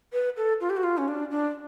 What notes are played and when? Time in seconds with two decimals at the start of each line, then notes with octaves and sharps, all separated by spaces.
0.13 B4
0.37 A4
0.61 F4
0.70 G4
0.77 F#4
0.84 F4
0.98 C#4
1.08 D4
1.31 D4